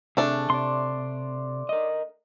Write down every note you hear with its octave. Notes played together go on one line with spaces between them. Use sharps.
C3 A3 D4 G#4
C3 D5 C6
A#4 D#5